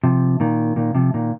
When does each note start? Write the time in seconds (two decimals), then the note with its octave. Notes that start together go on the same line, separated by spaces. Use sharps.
0.04 C3 F3
0.40 A#2 D#3
0.76 A#2 D#3
0.95 C3 F3
1.14 A#2 D#3